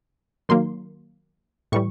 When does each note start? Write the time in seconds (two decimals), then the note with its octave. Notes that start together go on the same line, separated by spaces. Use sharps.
0.49 D#3 F#3 A#3 C6
1.72 A2 E3 G3 C#6